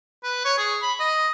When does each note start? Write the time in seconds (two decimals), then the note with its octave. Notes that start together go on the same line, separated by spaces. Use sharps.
0.24 B4
0.45 C#5
0.58 G#4
0.82 B5
1.00 D#5